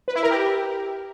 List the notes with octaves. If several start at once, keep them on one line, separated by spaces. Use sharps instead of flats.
B4
E4
A#4
G4